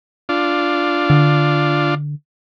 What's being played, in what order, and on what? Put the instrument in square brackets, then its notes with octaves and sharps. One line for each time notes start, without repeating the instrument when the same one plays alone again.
[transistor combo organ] D4 F4
[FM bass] D3